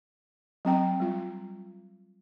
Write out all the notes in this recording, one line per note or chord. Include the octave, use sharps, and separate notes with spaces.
F#3 C4 G5 A#5
G3 F4